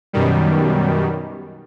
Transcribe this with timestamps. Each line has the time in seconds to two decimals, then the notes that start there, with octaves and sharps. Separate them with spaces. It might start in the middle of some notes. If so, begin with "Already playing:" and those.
0.13 F#2 B2 D#3 G3